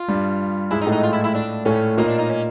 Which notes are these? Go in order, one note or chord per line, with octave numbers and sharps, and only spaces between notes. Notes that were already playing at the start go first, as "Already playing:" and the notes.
Already playing: F4
G2 G3
G#2 G#3 E4
D#4
A2 A3
D#4
F4
E4
E4
D4
A2 A3 C#4
A#2 A#3 D#4
D4
D#4
C#4